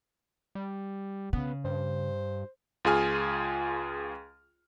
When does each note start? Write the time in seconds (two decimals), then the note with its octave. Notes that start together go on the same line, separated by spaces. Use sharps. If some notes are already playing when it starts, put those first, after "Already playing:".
0.55 G3
1.33 C#3 B3
1.65 G2 C5
2.85 C#2 F4 G#4 G#5 F6